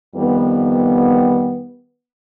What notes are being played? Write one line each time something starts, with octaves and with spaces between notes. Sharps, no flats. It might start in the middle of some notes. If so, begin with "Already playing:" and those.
F2 D#3 G3 B3